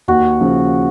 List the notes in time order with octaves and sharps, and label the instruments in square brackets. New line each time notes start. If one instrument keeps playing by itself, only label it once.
[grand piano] D#2 [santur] F#4
[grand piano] C#3 F3